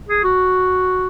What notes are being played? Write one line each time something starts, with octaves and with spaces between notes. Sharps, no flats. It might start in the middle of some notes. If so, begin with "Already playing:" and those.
G#4
F#4